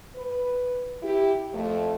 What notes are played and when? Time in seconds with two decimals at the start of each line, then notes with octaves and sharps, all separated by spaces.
0.15 B4
1.03 E4 G4
1.54 F2 A3